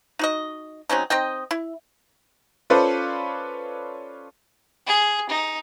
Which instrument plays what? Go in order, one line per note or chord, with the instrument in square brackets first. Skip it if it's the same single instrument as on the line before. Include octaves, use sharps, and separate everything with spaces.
[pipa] D#4 F#4 D#5
F#3 C4 C#4 D#4
C4 D#4 D#5 G5
E4
[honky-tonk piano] C#4 F4 A4 B4 C5 D5
[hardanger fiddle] G#4
D#4